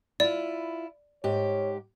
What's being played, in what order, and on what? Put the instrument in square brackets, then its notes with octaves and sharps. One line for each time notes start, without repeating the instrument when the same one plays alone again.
[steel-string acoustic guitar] E4 F4 [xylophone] D5
[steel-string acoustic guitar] G#2 G4 [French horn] C#5